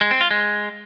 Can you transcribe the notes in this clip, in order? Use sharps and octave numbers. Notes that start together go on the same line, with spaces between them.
G#3
C4
F4
G#3